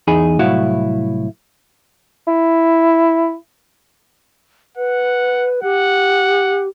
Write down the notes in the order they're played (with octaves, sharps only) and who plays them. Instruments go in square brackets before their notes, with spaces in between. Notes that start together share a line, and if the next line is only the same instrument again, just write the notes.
[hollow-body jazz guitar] E2 D#4 G#4 B5
C2 A2 F#3 E4 F#4 F5
[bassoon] E4
[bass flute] B4 [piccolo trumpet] F#5
[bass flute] G4 [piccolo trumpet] F#5